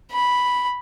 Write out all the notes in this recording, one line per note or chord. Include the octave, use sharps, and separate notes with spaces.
B5